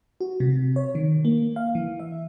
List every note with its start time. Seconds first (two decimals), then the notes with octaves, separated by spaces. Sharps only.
0.21 F#4
0.40 C3
0.76 C#5
0.95 D#3
1.25 A#3
1.56 F5
1.75 E3
2.00 E5